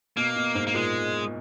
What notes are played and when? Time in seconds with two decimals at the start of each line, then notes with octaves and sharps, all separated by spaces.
0.17 B2 A#3
0.36 B2
0.55 G#2
0.67 A#3
0.74 A#2 G#3